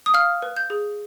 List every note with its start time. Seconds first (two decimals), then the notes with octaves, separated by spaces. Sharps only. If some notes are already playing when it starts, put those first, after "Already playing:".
0.06 D#6
0.14 F5 F6
0.42 B4
0.56 G6
0.70 G#4